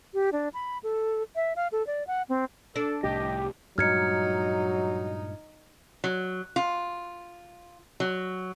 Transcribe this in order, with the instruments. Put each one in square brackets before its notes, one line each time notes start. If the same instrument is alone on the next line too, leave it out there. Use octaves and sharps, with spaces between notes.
[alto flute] G4
D4
B5
A4
E5
F5
A4
D5
F#5
C4
[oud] D4 [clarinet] A4
[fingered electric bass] C2 A2 [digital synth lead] G4 [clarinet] D#5
[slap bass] G2 A#2 G#3 [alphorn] F#3 [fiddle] D#4 [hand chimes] F6 G#6 C#7
[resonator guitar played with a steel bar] F#3
F4
F#3